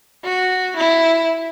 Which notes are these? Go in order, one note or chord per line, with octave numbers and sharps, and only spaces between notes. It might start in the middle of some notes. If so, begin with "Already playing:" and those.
F#4
E4